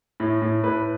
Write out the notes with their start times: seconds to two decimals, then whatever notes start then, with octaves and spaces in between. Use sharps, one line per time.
0.20 A2
0.42 A2
0.63 A2 B4